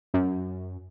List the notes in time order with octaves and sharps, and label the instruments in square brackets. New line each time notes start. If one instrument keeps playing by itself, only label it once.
[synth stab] F#2